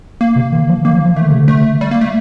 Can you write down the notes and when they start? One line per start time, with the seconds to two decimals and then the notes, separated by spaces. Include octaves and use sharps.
0.21 A#3
0.36 C3
0.52 D#3
0.69 F3
0.84 D#3 A#3
0.95 F3
1.05 F3
1.16 D#3 A3
1.24 D3
1.32 C3
1.41 D3
1.48 A3
1.81 G3
1.91 A#3
2.01 A3